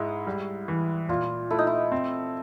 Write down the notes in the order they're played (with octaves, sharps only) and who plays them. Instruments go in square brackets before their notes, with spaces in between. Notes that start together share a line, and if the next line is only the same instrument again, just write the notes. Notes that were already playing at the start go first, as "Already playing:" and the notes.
Already playing: [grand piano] G#2 G#3 [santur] E4
[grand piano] G3
E3
[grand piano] A#2 [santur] F4
[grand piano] A3 [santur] E4
[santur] D#4
E4
[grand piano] C4